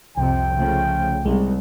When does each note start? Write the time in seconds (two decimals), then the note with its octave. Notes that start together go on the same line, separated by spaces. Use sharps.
0.18 C2 F2 C3 G5
0.57 C#3 F3 A3
1.26 C2 G#3